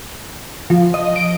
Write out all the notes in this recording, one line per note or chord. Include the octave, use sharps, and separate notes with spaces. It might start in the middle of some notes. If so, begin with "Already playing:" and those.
F3
D#5
D7